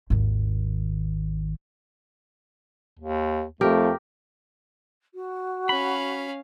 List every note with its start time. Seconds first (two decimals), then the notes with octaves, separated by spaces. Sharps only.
0.10 G#1 D#2
2.99 D#2
3.61 F2 A3 G4 A#4
5.14 F#4
5.69 C#4 F5 B5